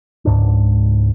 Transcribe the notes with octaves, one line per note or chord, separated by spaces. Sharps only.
C#2 G#2 D4